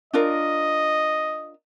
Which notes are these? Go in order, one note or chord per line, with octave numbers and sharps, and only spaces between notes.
D4 F4 A#4 D#5